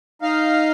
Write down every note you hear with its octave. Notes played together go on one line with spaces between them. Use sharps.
D#4 F5